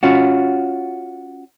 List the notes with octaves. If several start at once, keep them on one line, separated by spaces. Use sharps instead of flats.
C#4 F4 F#4